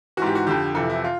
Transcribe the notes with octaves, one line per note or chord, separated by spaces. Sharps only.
G#2 E3 F#4 G4
F#4
F2 D3 G4
F2 C3 E3 A4
E4
F4